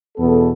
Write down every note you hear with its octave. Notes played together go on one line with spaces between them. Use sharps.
E2 B2 B3 A4